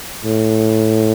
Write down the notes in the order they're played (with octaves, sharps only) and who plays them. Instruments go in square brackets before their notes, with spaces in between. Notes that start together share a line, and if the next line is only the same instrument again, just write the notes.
[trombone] A2